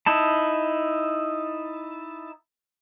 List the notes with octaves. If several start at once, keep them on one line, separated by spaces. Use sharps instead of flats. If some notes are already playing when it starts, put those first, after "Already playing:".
D#4 E4 A5